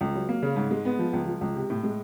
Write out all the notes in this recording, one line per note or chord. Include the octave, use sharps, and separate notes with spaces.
C#2
F#3
A#3
C#3
G#2
G#3
B3
F3
C#2
F3
C#2
C3
A2
G#3